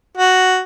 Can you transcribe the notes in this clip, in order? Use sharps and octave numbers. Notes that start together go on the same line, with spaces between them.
F#4